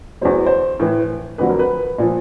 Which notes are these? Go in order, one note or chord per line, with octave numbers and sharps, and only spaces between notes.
E2 B2 F#3 C5
C5
A2 E3
F2 D3 F#3 B4
A#4
B4
A#2 F3